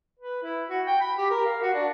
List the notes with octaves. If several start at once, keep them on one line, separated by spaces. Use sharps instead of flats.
B4
E4
F#4
G5
B5
G4
A#4
F5
F#4
D4